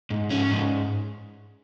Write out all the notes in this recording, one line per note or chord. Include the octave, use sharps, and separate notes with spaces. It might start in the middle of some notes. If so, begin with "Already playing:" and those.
G#2
C#4
G#2